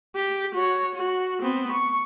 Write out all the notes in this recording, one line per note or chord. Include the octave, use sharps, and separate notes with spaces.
G4
F#4 C#5
F#4
B3 C4
C#6